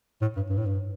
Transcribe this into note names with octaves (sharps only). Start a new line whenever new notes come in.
A2
G2
G2
A2
G2